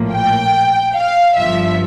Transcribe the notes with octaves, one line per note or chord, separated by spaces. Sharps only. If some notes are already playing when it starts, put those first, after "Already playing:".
Already playing: A#1 A2 F3 A#3
G5
F5
G1 G2 F3 E5